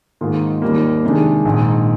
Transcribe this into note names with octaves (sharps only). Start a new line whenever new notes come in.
G#2 D#3 A#3 F4
D#2 D#3 G3 A#3
F2 C3 D#3 G#3 D4
A#1 G#2 D#3